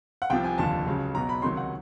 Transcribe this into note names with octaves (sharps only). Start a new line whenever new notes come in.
F#5
C2 C3 F3 G5
G#5
F1 D#2 D3 F3 A5
C#2 C#3 F#3
B1 B2 F#3 A#5
B5
C#2 C3 D#3 F#3 C6
F#5